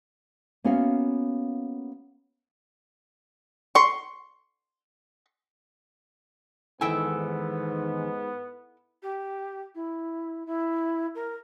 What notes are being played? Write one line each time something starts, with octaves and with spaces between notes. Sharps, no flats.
A#3 B3 C#4 F#4 E5 F5
C6 C#6
E2 G#2 D#3 B3 E4 A4 G5 G#5
G4
E4
E4
A#4